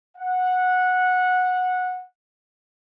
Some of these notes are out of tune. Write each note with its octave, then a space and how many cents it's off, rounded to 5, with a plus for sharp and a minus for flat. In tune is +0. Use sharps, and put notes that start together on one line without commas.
F#5 -15